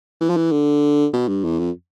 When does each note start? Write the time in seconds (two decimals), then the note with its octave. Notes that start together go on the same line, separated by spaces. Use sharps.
0.21 E3
0.29 F3
0.37 E3
0.52 D3
1.14 B2
1.28 G2
1.44 E2
1.59 F2